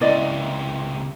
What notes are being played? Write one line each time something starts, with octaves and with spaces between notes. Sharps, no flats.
C#2 C3 E4 D5 D#5